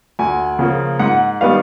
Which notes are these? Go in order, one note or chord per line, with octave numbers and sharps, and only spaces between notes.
D2 G#5
C#3 F3 A#3
G#2 F#5
D#3 G3 B3 F5